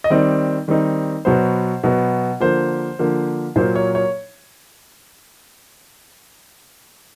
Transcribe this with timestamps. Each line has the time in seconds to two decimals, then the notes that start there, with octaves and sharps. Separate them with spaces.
0.04 D#5
0.10 D#3 G3 C4 D#4 D5
0.68 D#3 G3 C4 D#4
1.25 B2 F#3 B3 C5
1.83 B2 F#3 B3
2.40 D3 F3 A#3 C5
2.99 D3 F3 A#3
3.56 A#2 F#3 A#3 C5
3.76 C#5
3.95 C#5